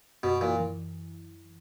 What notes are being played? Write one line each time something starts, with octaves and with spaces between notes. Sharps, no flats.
F#2 B2
A#2 E3
E3